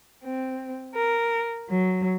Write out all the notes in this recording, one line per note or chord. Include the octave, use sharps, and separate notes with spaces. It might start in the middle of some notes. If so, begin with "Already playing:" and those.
C4
A#4
F#3